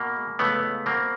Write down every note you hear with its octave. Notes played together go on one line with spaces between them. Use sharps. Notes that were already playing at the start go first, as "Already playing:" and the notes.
Already playing: B2 A#3
G#3
C#2 A3 B3
C#2
B2 A#3 C4